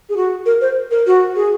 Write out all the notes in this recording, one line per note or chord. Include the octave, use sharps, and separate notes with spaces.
G#4
F#4
A#4
C5
A#4
F#4
G#4